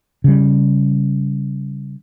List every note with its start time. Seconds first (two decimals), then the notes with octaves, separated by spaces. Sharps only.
0.24 C#3 G3